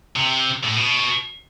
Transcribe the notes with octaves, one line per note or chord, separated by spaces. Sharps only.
C3
A2
B2